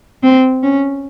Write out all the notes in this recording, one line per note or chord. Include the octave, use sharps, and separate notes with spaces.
C4
C#4